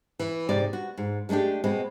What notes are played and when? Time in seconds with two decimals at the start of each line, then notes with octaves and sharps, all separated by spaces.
0.19 E3
0.49 G#2 C3 D5
0.73 F#4
0.98 G#2
1.29 G#3 A3 C#4 D4 G4
1.64 B2 G#3 C4